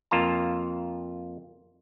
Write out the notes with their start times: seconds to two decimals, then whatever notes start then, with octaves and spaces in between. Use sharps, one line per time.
0.11 F2 A#3 F4 A5 A#5